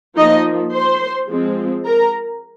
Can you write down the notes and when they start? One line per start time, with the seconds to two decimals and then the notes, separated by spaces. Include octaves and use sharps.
0.17 F3 A#3 D#4 D#5
0.73 C5 C6
1.30 F3 G#3 C4
1.86 A#4 A#5